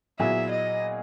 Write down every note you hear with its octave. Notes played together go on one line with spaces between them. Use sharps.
A#2 F#3 B3 E4 G#4 E5
D#5